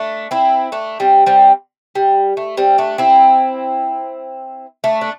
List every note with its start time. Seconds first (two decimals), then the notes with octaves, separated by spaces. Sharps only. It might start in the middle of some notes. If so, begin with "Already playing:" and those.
Already playing: A3 D4
0.31 C4 E4
0.72 A3 D4
1.00 G3 C4
1.26 G3 C4
1.95 G3
2.37 A3
2.57 G3 C4
2.78 A3 D4
2.98 C4 E4
4.84 A3 D4
5.01 D4